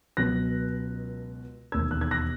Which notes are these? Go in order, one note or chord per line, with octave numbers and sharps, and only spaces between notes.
C#2 B2 F#3 F#6 A#6
E1 D#2 D#3 E6 G#6
F#6
G#6
F#6 A#6